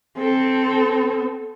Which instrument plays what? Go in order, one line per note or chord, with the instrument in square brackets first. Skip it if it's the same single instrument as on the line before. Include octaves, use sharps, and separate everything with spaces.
[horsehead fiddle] C4 A4